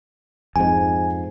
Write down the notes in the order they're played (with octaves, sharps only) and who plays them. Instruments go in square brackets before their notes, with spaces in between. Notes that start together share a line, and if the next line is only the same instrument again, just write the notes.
[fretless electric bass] F2 G#2 [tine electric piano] G#5